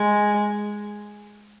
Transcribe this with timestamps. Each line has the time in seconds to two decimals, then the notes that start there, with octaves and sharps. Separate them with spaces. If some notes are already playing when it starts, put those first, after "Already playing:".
Already playing: G#3